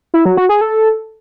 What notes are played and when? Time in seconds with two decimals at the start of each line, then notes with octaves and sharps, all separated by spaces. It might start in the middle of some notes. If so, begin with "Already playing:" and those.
0.14 E4
0.25 F#3
0.37 F#4
0.49 G#4
0.61 A4